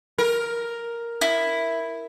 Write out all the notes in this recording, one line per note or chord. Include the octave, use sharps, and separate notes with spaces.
A#4
E4